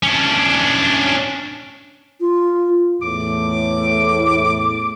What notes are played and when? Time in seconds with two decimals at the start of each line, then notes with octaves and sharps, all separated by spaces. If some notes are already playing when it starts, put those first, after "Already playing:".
0.03 C#4 D4
2.20 F4
3.02 E2 A2 D6